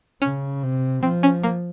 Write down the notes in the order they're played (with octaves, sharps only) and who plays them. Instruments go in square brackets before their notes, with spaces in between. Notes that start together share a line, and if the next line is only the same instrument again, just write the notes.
[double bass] C#3 [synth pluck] C#4
[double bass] C3
[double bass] F3 [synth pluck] C4
[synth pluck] C#4
A#3